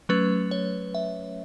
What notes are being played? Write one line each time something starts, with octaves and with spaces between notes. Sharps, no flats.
F#3 A3 C#4 B4
C#5
E5